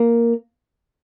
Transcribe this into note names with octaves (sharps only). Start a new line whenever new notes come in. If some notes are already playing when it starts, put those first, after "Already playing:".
Already playing: A#3